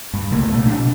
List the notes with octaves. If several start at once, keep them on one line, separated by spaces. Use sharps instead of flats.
G2
C2 C3 A3 A#3
C2 A#2 A3
A#1 D4
B2